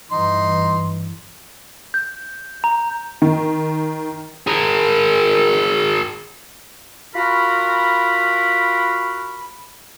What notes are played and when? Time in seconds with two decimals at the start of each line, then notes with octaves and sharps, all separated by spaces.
0.12 G2 E3 D#4 C6
1.94 G6
2.64 A#5
3.22 D#3
4.47 G#4 A#4
7.15 F4 F#4 A#4 B5